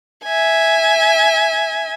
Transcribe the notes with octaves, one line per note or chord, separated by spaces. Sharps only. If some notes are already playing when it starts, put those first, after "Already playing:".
E5 G#5